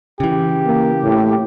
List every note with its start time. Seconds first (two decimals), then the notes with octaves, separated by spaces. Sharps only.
0.20 C#3 E3 G4
0.66 A#3
1.04 A2